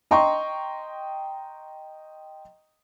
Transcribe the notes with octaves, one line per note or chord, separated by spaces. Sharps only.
D#5 G5 A#5 C6 C#6